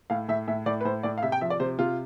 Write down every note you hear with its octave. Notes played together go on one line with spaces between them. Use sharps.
A2 F5
A2 E5
A2 E5
A2 D5
B4
A2 C5
A2 D5
F5
C3 E5
G5
F3 E5
D5
C3 C5
C3 F4